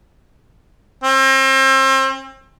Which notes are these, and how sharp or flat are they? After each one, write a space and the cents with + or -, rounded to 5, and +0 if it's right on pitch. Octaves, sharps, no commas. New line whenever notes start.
C4 +35